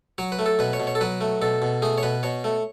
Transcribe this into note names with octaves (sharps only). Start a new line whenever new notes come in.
F#3 C#5
B4
A3
A4
B2 B4
C#5
B2
C#5
A4
F#3 B4
A3
B2 A4
B2
A3 G#4
C#5
B2 B4
B2 C#5
A3